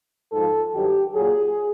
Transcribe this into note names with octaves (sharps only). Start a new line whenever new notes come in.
G#2 F3 A4
G2 D#3 F#3 G4
A#2 F#3 G#4